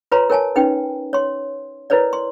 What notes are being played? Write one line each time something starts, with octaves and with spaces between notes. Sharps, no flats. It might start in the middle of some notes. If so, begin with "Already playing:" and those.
F4 B4 C#5 A#5 C6
A#4 C#5 G#5 A5
C#4 D#4 B4 G5
C#5 C6
E4 A#4 B4 C#5 D5
C6